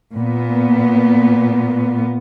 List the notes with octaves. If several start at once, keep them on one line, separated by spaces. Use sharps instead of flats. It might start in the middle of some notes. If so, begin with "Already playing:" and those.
A#2 B3